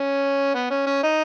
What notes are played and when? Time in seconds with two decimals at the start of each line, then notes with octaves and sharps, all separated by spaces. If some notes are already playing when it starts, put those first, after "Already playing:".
Already playing: C#4
0.54 B3
0.70 C#4
0.87 C#4
1.03 D#4